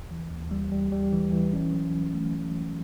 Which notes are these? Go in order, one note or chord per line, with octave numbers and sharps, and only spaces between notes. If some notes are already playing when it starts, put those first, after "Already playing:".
Already playing: D#2
E3
D#2
G3
G3
G3
E3
E3
C#4
F#3
C#4
A3
C#4
A3